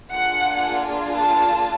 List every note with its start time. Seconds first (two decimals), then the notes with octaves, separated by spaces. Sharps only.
0.12 A#3 D4 F4 G#4 F#5
1.16 A5